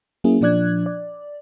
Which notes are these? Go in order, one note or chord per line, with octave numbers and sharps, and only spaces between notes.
F#3 A#3 C#4 E4 G#4
A#2 F3 D4 D5 F#6 G#6
D5